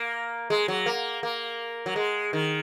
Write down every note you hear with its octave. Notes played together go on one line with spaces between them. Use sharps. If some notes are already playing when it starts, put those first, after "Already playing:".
Already playing: A#3
G#3
F#3
A#3
A#3
F#3
G#3
D#3